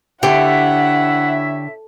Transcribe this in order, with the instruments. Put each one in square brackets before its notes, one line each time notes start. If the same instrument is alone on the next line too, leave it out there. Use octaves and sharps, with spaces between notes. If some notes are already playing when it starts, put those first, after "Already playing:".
[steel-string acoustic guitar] D3 [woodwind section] E4 C#5 E5 [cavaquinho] G4 [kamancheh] F#5